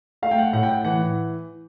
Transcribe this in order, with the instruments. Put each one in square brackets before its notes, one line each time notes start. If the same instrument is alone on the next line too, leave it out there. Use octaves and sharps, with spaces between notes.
[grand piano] A3 F5
G5
F#5
A2 F#5
G5
F#5
E3 F#5